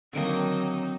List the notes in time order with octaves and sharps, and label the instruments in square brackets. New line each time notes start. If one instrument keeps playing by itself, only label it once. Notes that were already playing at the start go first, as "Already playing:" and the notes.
[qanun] D3 D#3 A#3 [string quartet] F#3 D#4 [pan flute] C4